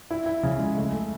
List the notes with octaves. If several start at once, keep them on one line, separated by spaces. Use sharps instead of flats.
E4
E4
C#3
G#3
A3
A3